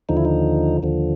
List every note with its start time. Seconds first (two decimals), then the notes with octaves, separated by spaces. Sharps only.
0.09 D#2 D3 F3 D#4
0.17 E4
0.25 D#4
0.83 D#2 D3 F3